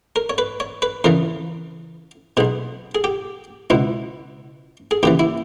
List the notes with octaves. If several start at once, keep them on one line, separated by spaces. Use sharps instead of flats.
A#4
C#5
B4
C#5
B4
E2 C#3 E3 A#4
B1 B2 G#4
G#4
G4
C#2 B2 E4
G#4
D#2 C#3 E3 G4
E4